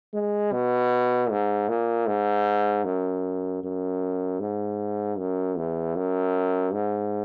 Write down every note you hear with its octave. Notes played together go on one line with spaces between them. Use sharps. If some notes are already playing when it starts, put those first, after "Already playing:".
G#3
B2
G#2
A#2
G#2
F#2
F#2
G#2
F#2
E2
F#2
G#2